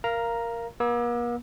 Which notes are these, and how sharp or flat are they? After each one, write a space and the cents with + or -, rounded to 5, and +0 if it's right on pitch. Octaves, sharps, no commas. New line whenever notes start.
A#4 +0 F5 -20 A#5 +5
A#3 +45 E6 -20